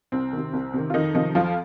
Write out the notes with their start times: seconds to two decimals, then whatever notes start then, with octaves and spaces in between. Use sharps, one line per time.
0.12 C2 C4
0.33 C3 D#3
0.53 C2
0.73 C3 D#3
0.90 F4
0.94 F2 D#3 D#4
1.14 C3 D#3 F3 D#4
1.35 F2 F3 F4